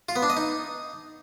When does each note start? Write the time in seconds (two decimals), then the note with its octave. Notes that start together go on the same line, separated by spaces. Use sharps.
0.09 F4
0.16 B3
0.23 D4
0.30 D#5
0.37 D#4